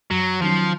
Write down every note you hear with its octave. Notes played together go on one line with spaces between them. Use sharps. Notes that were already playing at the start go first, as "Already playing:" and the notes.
F#2 F#3
D#3 F3 F#3 C#4